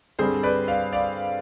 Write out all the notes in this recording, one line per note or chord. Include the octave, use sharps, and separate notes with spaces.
G2 D3 G3 C4 G#4 C5
B4 D5
D5 F5
D5 F5